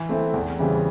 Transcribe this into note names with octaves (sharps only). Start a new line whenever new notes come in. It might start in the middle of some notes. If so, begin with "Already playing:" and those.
Already playing: E3
A3 C4 E4
E2
C#3 E3 G3 C4